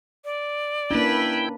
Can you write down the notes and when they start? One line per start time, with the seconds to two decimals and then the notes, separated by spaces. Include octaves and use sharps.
0.24 D5
0.91 A#3 C#4 D4 E4 B4 G5 B5